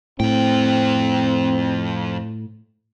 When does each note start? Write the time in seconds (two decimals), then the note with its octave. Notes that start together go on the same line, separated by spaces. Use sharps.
0.20 F2 A2 C4 G5